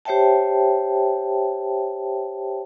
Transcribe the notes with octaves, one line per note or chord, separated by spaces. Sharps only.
G4 C5 C#5 E5 G5 A5